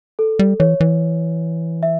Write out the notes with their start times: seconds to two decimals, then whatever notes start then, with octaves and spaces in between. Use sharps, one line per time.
0.19 A4
0.39 G3
0.60 E3 C#5
0.81 E3
1.83 E5